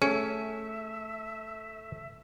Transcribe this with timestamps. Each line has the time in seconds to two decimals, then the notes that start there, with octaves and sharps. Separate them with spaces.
0.02 A3 C#4 G#4 E5 G#5 C#7